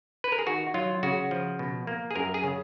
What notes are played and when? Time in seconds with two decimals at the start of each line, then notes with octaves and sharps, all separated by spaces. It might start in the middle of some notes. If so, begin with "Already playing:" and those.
0.24 B4
0.32 A#4
0.39 G#4
0.47 D#3 F#4
0.74 F#3 F4
1.03 C#3 F#4
1.31 F3
1.59 B2
1.87 A#3
2.11 G#4
2.16 F#2 A#4
2.34 G#4
2.44 C#3